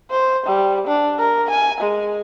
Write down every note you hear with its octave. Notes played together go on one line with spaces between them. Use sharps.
C5
G3
D4
A#4
G#5
G#3